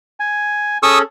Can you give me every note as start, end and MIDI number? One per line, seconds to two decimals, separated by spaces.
0.20 0.78 80
0.83 1.02 61
0.83 1.02 68
0.83 1.02 69
0.83 0.99 85
0.83 0.99 87
0.83 0.99 88